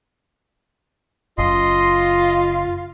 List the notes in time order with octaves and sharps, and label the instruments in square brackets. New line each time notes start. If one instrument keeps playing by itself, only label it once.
[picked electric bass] F#1 [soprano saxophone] F4 [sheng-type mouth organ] D#5 C6